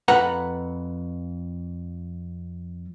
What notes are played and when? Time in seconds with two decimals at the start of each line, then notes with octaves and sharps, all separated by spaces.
0.08 F2 B4 F#5 A#5